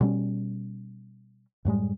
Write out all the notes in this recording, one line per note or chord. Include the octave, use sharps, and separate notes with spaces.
B2 G3 C#4
F#2 A2 G3 G#3